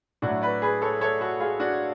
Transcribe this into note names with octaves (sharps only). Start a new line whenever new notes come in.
A2 F#3 A3 D4 F#4
B4 D5
G#4 B4
A4 C#5
A4 C#5
F#4 A4
F4 G#4
D4 F#4